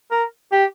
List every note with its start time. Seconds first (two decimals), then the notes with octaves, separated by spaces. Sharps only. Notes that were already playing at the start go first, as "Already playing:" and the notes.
0.11 A#4
0.52 G4